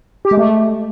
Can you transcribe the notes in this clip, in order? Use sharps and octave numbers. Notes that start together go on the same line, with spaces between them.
G4
G#3
A3